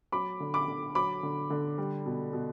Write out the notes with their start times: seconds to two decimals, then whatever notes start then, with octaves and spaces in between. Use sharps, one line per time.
0.12 F#3 B5 D6
0.40 D3
0.54 B5 D6
0.68 D3
0.95 F#3 B5 D6
1.23 D3
1.50 D3
1.78 G3
2.06 B2
2.33 B2